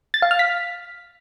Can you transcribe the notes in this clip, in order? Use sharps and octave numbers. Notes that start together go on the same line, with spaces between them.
A6
F5
F6
B6